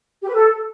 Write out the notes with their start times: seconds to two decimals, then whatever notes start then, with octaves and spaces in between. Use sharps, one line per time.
0.23 G4
0.28 B4
0.34 A4